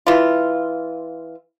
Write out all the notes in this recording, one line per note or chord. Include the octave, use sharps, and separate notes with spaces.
E3 F4